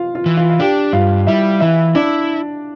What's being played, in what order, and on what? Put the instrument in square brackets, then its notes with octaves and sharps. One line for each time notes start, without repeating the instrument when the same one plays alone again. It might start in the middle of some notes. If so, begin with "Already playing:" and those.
Already playing: [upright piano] F4 F5
F4 F5
[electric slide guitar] E3
[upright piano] F4 F5
F5
[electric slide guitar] D4 [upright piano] G4 G5
[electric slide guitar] G2 [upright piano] F4 F5
[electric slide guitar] G3 [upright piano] E4 E5
[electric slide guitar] E3 [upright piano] E4 E5
[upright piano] D4 D5 [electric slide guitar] E4